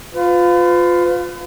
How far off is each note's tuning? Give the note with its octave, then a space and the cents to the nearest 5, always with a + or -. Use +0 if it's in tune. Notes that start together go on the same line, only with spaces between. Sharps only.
F4 +15 B4 +40